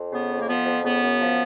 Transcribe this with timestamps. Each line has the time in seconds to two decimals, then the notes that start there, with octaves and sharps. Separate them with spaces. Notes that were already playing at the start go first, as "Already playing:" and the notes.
Already playing: F2
0.12 C#3 B3
0.31 F2
0.40 A#3
0.48 F3 B3
0.66 F2
0.83 C#3 B3
1.02 F#2
1.20 F3